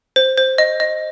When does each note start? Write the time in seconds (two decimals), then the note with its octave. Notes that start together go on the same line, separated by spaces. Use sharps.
0.16 C5
0.37 C5
0.58 D#5
0.80 D#5